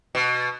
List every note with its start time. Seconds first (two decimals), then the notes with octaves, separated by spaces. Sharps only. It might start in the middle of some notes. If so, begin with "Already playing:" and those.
0.15 B2